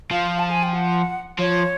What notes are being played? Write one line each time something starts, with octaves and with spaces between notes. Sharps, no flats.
F3 F5
A5
G#5
G5
F#5
F3 C#5